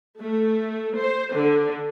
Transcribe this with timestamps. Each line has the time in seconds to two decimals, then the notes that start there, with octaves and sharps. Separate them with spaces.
0.20 A3
0.99 C5
1.35 D3